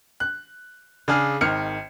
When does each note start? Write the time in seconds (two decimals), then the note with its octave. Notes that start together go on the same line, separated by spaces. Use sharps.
0.20 F#6
1.08 C#3 D4 G#4 G#5 F6
1.41 G#1 D#3 F6 C#7